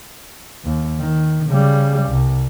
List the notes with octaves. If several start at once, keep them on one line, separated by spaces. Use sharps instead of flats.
D#2
D#3
C#3 G3
C2